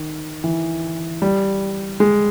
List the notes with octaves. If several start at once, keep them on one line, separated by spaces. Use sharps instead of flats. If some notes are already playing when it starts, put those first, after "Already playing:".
Already playing: D#3
E3
G3
G#3